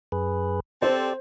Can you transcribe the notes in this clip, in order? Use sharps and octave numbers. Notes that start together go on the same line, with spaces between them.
F#2 G#4 B4
C4 G4 A4 C5 D5